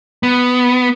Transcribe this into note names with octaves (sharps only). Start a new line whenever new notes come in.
B3